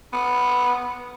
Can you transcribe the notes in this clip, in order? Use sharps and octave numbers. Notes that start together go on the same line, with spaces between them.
B3